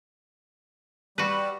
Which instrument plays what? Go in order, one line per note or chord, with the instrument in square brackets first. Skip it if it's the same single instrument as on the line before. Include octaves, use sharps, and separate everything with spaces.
[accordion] G3 [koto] F#4 B4